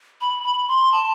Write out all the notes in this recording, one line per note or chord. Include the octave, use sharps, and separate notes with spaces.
B5
B5
C6
A5